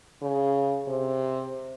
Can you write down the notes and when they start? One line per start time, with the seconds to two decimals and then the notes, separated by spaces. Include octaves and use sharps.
0.22 C#3
0.88 C3